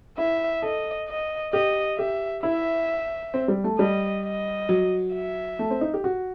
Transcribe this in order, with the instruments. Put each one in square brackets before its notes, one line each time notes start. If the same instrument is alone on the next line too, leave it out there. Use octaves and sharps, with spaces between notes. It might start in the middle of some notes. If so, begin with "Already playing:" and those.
[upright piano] E4 [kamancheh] E5
[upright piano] A4 [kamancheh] D#5
[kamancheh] D#5
[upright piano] G4 [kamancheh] D#5
[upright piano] G4 [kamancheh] E5
[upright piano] E4 [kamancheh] E5
[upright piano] C4
G3
A3
[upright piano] G3 [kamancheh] D#5
[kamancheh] D#5
[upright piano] F#3
[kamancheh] E5
[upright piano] A3
C4
D#4
G4
F#4